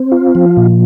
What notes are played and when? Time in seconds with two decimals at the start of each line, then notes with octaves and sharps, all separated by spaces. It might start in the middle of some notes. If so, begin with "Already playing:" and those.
Already playing: C4
0.12 F4
0.35 F3
0.57 A#2